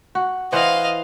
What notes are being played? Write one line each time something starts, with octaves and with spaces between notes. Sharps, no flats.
F#4
E3 C5 D#5 F5 F#5